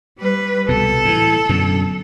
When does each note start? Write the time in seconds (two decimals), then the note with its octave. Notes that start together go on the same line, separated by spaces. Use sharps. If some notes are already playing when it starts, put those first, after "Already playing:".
0.18 G3 B4
0.69 C2 B2 A4
1.05 A2 D#3 E3
1.49 F#2 B2 D3